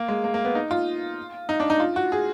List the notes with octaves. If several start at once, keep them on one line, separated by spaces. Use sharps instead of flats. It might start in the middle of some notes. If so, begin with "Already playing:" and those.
Already playing: A#3
G#3
A#3
A#3
B3
D#4
F4
D#4
D4
D#4
F4
F#4
G#4